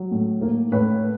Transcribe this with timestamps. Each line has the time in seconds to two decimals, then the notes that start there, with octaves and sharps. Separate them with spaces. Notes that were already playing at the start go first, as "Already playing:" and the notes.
Already playing: F#3
0.11 A2
0.41 A#3
0.72 A2 B4 C#5